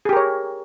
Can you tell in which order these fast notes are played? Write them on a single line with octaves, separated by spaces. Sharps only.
G#4 G4 A#4 C#5